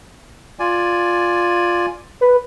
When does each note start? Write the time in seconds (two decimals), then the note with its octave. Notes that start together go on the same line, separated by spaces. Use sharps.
0.59 F4 D5 G#5
2.21 B4